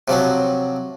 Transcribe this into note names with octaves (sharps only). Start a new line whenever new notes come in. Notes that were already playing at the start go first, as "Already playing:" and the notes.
C3 F3 F#3